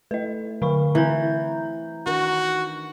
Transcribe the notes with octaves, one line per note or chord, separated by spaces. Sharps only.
A3 E4 B4 D#5
D3 F5 B5 C#6
E3 F#3 A3 C4 A#5 G6
D#3 D4 F#4 A#4